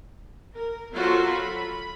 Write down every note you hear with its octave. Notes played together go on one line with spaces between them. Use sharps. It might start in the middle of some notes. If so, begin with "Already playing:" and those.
A#4
F#3 F4 F#4 A4 C5
B5